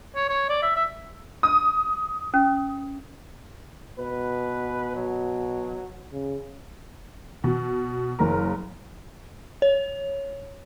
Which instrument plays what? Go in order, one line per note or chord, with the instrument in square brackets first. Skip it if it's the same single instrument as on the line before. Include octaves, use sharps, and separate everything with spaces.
[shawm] C#5
C#5
D5
E5
E5
[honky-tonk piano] D#6
[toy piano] C#4
[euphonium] B2 [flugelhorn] B4
[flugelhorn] F#3
[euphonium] C#3
[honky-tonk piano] B2
F#1 A#4 A#5
[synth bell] C#5